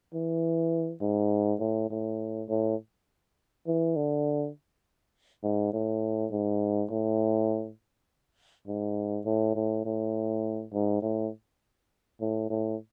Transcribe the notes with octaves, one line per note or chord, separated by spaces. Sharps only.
E3
G#2
A2
A2
A2
E3
D3
G#2
A2
G#2
A2
G#2
A2
A2
A2
G#2
A2
A2
A2